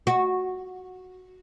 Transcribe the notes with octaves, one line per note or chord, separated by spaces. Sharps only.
F#4